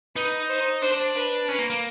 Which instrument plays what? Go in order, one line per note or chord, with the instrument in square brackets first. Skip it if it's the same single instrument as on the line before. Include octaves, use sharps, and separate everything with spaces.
[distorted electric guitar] D#4 [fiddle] B4
[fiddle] C5
[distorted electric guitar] D4 [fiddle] C5
[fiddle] B4
[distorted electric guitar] C#4
A#3
A#3